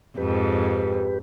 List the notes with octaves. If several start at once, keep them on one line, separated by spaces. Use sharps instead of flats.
F2 G#2 G4 B4